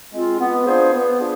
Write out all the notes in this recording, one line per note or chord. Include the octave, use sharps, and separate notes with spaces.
G#3 C4 F4
B3
D4 F4 G#4 C5
B3
D4 F4 G#4